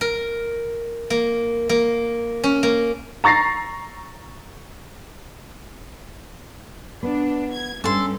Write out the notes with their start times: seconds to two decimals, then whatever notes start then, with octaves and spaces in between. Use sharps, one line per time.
0.01 A#4
1.10 A#3
1.69 A#3
2.44 C#4
2.63 A#3
3.24 A#5 C#6 A6 A#6 C7
7.03 B3 D4
7.53 G#6
7.84 G2 C#4 A4 C6